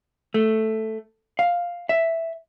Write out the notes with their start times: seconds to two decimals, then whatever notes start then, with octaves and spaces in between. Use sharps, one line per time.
0.34 A3
1.39 F5
1.89 E5